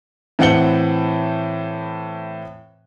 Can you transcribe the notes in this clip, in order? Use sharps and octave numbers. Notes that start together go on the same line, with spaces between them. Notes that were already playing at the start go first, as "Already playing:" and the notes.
A2 E3 C4 F#5 C#7 G7